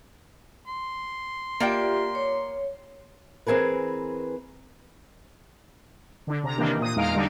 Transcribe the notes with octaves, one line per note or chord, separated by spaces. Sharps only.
C6
A#3 F4 G4 D5 E5 G5
C#5
E3 C4 G#4 A#4 B4
D3 D4
C3 A#5
C3 D#3 E3 A#3 D4 G4
A#2 D#6
E2 G#3 D#4 F5 A#5 D7
D3 G3 D4 D#4